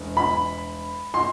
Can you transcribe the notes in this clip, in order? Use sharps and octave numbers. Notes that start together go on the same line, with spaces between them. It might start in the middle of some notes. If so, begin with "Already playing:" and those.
Already playing: E1
B5
C6